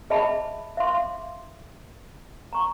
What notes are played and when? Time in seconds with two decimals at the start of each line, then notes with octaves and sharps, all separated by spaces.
0.10 G#4 D#5 E5 A5 B5
0.77 E5 F5 C6 D6
2.53 A#5 C#6